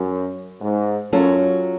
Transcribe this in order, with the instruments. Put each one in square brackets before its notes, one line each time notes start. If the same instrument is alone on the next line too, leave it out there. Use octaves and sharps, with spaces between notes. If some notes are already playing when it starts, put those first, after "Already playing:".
Already playing: [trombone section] F#2
G#2
[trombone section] F#2 [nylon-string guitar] F#3 C#4 F4 A4